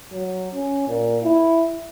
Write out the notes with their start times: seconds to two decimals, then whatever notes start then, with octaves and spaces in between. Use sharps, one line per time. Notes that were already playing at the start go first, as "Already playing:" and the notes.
0.12 F#3
0.53 C#4
0.88 A#2
1.23 E4